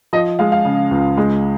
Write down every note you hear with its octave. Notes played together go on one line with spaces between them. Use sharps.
F3 D#5
G#3 F5
F5
C#3
C#2
G#3